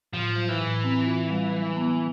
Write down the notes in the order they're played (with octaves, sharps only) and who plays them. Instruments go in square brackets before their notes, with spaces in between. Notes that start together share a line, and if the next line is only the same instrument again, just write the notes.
[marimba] A2 [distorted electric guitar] F3
[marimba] F#3
[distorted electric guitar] E3
[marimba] A2
C4
F4
G3
F#3
B3